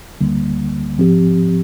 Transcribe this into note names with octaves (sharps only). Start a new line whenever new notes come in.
D2 D3 G3 A#3
G#2 F3 C4 G4